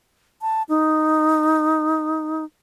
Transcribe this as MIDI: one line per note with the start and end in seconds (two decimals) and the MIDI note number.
0.42 0.63 81
0.69 2.45 63